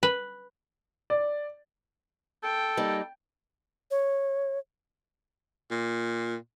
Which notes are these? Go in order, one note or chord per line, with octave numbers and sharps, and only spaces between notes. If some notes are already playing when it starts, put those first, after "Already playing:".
B4
D5
A4 G5
G3 A#3 D#4
C#5
A#2